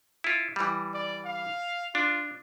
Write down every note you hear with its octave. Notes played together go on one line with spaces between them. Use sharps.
E4 F4
E3 G3
D5
F5
D4 F4